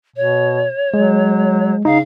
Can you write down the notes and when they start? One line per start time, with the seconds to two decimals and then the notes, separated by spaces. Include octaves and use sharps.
0.16 B2 C#5
0.94 F#3 G#3
1.85 C#3 D#4 F5